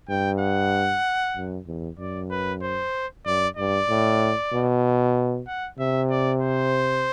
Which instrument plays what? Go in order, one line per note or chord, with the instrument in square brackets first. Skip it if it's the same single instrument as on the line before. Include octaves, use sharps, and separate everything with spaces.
[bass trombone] G2 [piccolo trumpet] G5
[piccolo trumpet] F#5
[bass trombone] F#2
E2
[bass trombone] F#2 [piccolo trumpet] D5
[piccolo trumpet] B4
C5
[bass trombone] F#2 [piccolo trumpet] D5
[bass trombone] G2 [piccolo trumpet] D5
[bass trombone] A2
B2
[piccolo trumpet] F#5
[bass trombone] C3 [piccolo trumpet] E5
[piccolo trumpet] D5
C5